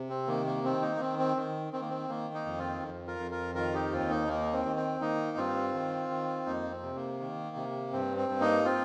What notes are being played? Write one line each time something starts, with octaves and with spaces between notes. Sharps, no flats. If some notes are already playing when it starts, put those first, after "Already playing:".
Already playing: C3
C4
D#3 A#3
A#3
D#3 C4
A#3 D#4
A#3
D#3 C4
C4
D#3
D#3 C4
A#3
C4
D#3 A#3
A#3 D#4
F2
C4 F4
F2
F4 A#4
F2
F4 A#4
D#3 F4 A#4
D#4 G4
D#2 C4 F4
A#3 D#4
D#3 A#3
C4
D#3
C4
D#3 A#3 D#4
G2 C4 F4
D#3
D#3
F2 A#3 D#4
C4
C3
A#3
D#3
C3
G2 C4
C4
G2
A#3 D#4
C4 F4